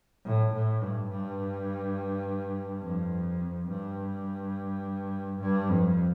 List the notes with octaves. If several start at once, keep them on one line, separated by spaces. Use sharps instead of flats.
A2
A2
G2
G2
F2
G2
G2
F2